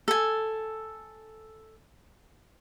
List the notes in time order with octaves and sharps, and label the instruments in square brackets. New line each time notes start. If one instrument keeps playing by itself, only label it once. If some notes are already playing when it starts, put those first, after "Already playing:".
[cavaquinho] A4 G#5